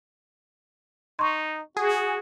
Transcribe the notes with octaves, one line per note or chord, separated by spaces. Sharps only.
D#4 C6 C#6
F#4 G#4